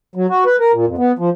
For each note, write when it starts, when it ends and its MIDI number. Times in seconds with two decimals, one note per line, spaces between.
0.15 0.26 54
0.30 0.44 66
0.46 0.56 71
0.60 0.72 70
0.73 0.85 46
0.87 0.95 41
0.98 1.12 59
1.19 1.30 53